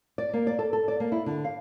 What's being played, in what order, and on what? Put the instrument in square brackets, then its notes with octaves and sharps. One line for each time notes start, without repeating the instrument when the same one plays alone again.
[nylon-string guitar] D5
A#3
D5
A4
A4
D5
A#3
E4
D3
F5